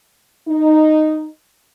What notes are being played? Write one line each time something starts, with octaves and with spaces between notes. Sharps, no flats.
D#4